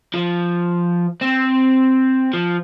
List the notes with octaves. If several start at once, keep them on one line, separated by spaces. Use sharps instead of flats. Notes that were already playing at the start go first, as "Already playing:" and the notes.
F3
C4
F3